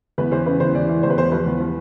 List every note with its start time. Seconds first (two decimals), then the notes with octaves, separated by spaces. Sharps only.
0.18 E2 B4
0.31 E3 C5
0.46 C#3 B4
0.60 E2 C5
0.74 E3 D5
0.89 E3
1.03 E2 C5
1.10 B4
1.17 E2 C5
1.32 F3 B4
1.46 E2
1.60 F3